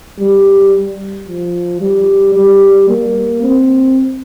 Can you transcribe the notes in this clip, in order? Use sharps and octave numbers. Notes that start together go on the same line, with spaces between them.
G3
F3
G3
G3
A#3
C4